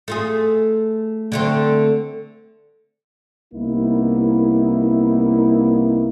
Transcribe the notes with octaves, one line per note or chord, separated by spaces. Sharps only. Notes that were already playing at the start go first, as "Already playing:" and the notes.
A3 F4 G#4
D3 A3 C4
C2 A#3 B3 D#4 E4